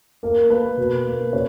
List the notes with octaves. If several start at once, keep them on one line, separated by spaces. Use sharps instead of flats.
A#3 A#4
A#3 B4
B2
A#3
C#3 C#5